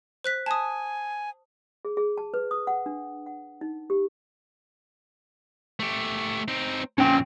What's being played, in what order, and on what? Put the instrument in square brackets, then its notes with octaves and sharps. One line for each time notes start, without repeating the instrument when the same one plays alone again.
[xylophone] C5 F#6 B6
[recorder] G#5 [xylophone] A5 D#6
[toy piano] G#4
G#4
A5
B4
D#6
F#5
D4
F#5
D#4
G4
[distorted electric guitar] A3 G4
C4 D#4
[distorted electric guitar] F2 A#2 [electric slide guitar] C#4 G5